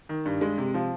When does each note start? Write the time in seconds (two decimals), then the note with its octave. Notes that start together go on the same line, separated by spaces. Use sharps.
0.09 D#3
0.26 G2
0.41 G#3
0.58 C3
0.74 F3